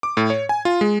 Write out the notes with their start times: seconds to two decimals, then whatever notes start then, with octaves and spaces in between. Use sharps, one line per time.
0.03 D6
0.17 A2
0.30 C#5
0.49 G#5
0.65 F4
0.81 G#3